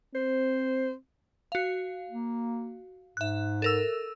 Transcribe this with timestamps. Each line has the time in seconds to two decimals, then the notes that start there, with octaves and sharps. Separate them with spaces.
0.15 C4 C5
1.52 F#4 F5
2.09 A#3
3.17 G#2 E5 F#6
3.62 A4 A#4 E6